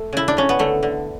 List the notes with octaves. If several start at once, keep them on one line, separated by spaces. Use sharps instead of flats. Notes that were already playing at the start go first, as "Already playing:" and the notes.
Already playing: A3
C#3 E4
D4
C#3 C#4
B3
D3 A3
D3